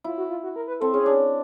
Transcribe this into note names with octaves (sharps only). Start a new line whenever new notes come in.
E4 F4
F#4
F4
F#4
A#4
B4
C4 A4
C#4 G#4
D4